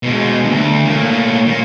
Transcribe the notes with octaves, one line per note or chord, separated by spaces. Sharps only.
B2 G#3
D2 G2
A2 A#3
A#2 A#3